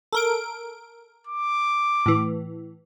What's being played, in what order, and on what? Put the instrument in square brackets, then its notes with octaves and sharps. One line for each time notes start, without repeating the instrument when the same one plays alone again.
[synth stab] A4 A#4 D7
[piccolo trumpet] D6
[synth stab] A2 E3